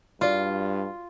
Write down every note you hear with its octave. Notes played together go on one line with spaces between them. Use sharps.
G2 F4 F#4 D5